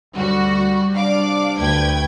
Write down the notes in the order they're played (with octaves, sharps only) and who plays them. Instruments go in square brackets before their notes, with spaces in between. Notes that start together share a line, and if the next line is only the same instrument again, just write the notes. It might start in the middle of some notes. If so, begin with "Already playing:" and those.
[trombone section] D2 [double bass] G3 [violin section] F#4
[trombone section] C3 D4 [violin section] D5 F5 D6
[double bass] D2 [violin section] B4 G5 G#6